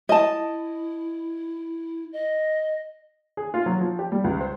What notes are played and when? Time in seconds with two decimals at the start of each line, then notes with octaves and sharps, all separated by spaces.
0.09 E4 D#5 A5
2.13 D#5
3.37 G#4
3.54 F4
3.66 F#3
3.81 F3
3.99 G4
4.12 G3
4.24 C#2
4.41 C5